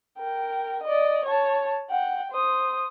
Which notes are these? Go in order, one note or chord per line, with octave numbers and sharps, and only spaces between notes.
A#4 G5
D5 D#5
C#5 A5
F#5 G5
C5 D#6